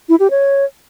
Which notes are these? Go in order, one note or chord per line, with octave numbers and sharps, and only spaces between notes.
E4
G4
C#5